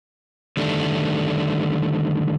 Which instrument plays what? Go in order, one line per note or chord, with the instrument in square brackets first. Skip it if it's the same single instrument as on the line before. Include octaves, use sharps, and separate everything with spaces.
[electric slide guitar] D3 D#3 G3 A3 D4